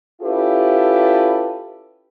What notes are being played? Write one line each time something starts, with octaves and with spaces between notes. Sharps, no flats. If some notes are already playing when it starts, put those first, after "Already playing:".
C#4 E4 F4 G4 A4 B4